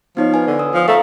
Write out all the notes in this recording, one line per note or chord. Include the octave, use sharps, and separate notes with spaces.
F3 B3 D#4 C#5
B4 G#5
D3
D#6 E6
F3
A3 F5 A#5